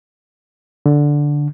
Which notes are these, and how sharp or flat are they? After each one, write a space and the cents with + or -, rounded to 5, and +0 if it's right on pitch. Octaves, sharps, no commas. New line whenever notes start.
D3 -5